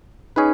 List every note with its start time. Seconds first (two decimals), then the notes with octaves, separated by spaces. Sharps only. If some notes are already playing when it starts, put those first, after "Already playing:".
0.36 C#4 D#4 G#4 B4